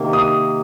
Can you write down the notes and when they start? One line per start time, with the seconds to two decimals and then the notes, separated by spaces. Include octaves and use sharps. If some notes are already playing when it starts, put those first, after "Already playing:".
Already playing: C3 D#3 A#3
0.13 D#6